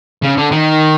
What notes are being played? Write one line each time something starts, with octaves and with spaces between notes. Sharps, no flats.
C#3
D3
D#3